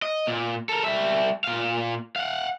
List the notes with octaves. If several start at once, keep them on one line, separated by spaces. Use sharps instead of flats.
D#5
A#2
A4 A#4
G3 E5
A#2 F5
F5 F#5